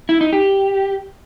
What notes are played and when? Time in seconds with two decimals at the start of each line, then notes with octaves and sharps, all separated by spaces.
0.09 E4
0.21 D#4
0.33 G4